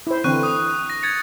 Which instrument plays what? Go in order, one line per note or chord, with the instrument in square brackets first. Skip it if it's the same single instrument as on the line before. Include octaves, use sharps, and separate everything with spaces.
[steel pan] E4 C5
[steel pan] D3 E3 C4 [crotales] C#6 F#6 D#7
[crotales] D#6
A#6
G#6 A6 C#7